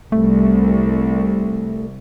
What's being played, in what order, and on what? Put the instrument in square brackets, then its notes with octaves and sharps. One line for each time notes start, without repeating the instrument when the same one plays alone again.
[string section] C2 [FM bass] A3